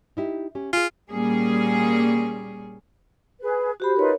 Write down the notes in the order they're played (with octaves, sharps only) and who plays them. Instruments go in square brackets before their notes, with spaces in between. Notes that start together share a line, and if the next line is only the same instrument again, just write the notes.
[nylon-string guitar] D#4 E4 G4
C#4 G4
[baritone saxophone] F4 [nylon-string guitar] G#4 G#5
[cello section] A#2 G3 A#3 C#4 G#4
[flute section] G#4 B4
[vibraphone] F#4 G4 B5 [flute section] C5
[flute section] D#4 F4 B4 [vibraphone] A#4 C#5